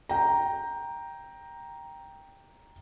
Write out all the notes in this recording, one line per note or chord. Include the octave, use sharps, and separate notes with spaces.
G5 A#5